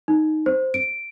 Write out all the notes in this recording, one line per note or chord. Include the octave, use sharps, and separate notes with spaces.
D#4
C5
D7